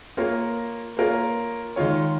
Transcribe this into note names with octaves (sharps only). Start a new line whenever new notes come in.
A#3 F4 A#4 C#5
A#3 F4 A#4 C#5
D#3 G#3 F4 C#5